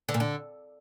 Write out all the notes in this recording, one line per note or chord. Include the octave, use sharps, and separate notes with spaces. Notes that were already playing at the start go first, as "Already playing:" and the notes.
D3
A#2
D3